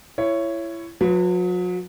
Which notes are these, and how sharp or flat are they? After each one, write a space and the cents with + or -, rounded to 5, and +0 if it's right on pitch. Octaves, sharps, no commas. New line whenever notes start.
E4 +25 C#5 +0
F#3 -40 B4 +0